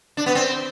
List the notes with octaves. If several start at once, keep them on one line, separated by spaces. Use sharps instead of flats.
D4
B3
C4